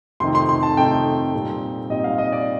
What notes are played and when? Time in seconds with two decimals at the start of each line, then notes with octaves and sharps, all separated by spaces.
0.20 F2 C3 D#3 A3 D#4 C6
0.35 C6
0.49 C6
0.63 A5
0.77 F2 C3 D#3 A3 D#4 G5
1.34 A#2 G3 C4 D#4
1.89 A#2 G3 C4 D#4 D#5
2.04 F5
2.18 D#5
2.32 D5